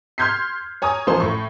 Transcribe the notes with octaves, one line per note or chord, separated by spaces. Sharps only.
C6 F6 G6 G#6 B6 C7
C#5 G#5 A#5 D#6
A1 F3 C5 C6
A2 C#6